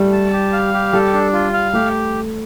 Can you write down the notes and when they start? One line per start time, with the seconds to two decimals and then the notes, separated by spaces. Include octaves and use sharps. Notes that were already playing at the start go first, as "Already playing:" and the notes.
Already playing: G3 A3
0.12 A5
0.32 G4
0.53 F5
0.74 G4
0.93 G3 A4
1.13 D4
1.33 F4
1.53 F5
1.73 A3 G4